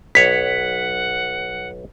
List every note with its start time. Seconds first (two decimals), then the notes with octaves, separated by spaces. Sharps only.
0.15 B1 C#5 F#5 B6